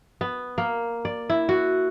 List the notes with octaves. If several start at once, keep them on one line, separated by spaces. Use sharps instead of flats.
B3
A#3
D5
E4
F#4